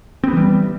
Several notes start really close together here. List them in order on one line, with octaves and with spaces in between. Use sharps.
C4 B3 E3 G3